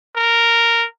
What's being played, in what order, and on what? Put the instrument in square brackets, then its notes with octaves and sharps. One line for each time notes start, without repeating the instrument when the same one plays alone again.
[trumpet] A#4